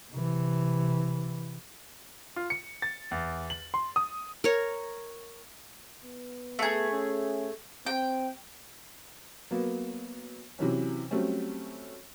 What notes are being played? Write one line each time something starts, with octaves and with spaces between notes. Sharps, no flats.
C3 E3
F4
C#7
A6
E2
F#7
C6
D#6
A#4 C#5
B3
A3 G#4
C#4
C4 G5
F#3 A#3 B3
C3 E3 F#3 C#4
F#3 G3 A3 C4 C#4